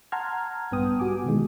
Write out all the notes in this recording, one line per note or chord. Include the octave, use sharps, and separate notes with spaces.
F#5 A5 A#5 C6 F6 G#6
A#1 G2 B3 G5 D#6
G3 F#4 G#5 D6
B2 D#3 E3 G#3